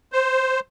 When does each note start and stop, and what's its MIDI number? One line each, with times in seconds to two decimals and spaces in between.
0.13 0.60 72